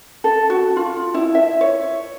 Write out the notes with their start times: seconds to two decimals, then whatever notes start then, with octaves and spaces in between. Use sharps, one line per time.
0.24 A4
0.50 F#4
0.77 F4
1.14 E4
1.35 E5
1.61 C#5